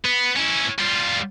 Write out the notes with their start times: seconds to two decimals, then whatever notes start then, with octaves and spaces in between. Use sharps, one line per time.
0.05 B3
0.37 C#4 E4
0.79 G3 F4